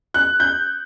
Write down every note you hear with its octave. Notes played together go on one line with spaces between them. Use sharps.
F#6
G6